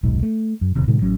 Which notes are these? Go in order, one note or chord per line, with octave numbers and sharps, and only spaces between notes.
D#1 B1 G#2
A3
F#2
D1 D#2 C3
A2 C3 D#3 G#3
A1 F#3 C#4